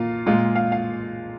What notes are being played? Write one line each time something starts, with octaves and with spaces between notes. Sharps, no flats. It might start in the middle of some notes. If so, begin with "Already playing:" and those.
Already playing: A#2 A#3 F4 F5
A#2 G#3 F4
F5
F5